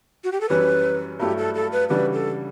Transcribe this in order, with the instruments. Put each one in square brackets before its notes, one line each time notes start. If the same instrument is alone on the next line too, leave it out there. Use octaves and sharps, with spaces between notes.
[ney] F#4
G4
A4
[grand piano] F#2 E3 G3 C#4 [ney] B4
[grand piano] G2 F#3 A3 E4 [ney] G4
[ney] A4
A4
B4
[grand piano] C#3 E3 G3 D4 F#4 [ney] B4
[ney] A4